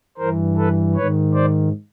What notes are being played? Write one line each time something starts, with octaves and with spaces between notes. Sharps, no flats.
G2 E3 A#4 C5
A4 B4
G#2 D#3 B4 C#5
C5 D5